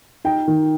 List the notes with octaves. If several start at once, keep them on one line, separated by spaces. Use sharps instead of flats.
D#4 G5
D#3